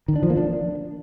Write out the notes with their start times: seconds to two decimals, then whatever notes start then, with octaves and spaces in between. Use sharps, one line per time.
0.08 D#3
0.16 D4
0.23 F3
0.30 A#3
0.37 D4